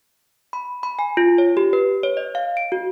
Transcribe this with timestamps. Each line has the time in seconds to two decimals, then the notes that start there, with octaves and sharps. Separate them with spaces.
0.53 B5
0.83 B5
0.99 G#5
1.17 F4
1.38 C#5
1.57 G4
1.73 B4
2.03 C#5
2.17 D#5
2.35 F5
2.57 D7
2.72 F#4